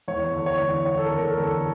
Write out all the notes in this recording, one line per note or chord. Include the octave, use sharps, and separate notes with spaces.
E2 C#5
D3
C#5
E2
E2 C#5
A4
A#4
D3
A#4
A4
E2
A4